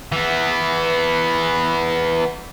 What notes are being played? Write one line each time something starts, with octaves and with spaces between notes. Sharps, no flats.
E3 B3